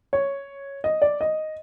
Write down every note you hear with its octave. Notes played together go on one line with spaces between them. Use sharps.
C#5
D#5
D5
D#5